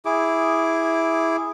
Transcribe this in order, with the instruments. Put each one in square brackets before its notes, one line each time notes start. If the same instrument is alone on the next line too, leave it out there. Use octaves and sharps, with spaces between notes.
[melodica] E4 G#4 D6